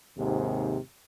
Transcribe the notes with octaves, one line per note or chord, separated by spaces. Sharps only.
D#2 G#2 C3